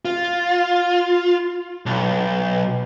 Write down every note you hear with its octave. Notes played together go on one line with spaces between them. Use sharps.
F4
B1